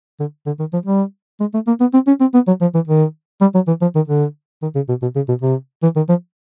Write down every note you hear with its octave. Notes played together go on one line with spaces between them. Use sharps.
D3
D3
D#3
F3
G3
G#3
A3
A#3
B3
C4
C#4
C4
B3
F#3
F3
E3
D#3
G3
F#3
E3
F3
D#3
D3
D#3
C#3
B2
B2
C#3
B2
C3
E3
D#3
F3